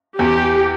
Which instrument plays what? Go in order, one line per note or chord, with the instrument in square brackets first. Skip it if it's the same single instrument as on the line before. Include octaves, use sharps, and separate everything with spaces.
[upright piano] E2 [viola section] G4